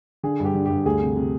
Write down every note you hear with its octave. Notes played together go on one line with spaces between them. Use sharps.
D3 G#4
G2 G4
D3
G2 G4
D2 G#4
C3
C3